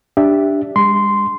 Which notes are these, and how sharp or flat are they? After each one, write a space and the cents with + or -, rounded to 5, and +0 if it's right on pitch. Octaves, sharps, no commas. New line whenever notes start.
D4 +0 G4 +0 E5 +0
G#3 -40 C6 -10